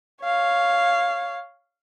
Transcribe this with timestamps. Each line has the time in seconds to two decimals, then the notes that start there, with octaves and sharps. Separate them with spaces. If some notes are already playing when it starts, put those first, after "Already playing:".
0.23 C#5 F5